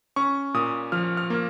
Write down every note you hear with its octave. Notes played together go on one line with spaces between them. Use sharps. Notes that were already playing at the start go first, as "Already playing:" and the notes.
C#4 C#6
A#2 D#6
F3 F6
F6
A#3